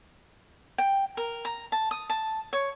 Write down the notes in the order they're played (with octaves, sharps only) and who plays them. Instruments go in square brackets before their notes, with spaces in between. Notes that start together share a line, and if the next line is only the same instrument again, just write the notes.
[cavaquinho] G5
A#4
A#5
A5
D#6
A5
C#5